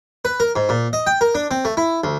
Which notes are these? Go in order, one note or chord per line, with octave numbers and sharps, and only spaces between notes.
B4
A#4
G#2
A#2
D#5
G5
A#4
D4
C4
A3
E4
D2